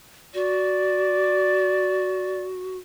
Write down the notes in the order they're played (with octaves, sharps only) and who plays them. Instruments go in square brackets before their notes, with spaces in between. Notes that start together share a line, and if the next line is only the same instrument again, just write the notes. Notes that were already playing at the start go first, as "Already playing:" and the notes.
[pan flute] F#4 [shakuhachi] D5